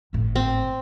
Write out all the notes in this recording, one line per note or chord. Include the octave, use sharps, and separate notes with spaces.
G#1 A2
C4